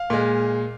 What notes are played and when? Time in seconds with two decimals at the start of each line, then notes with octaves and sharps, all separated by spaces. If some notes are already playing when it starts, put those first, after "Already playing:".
Already playing: F5
0.10 A#2 G#3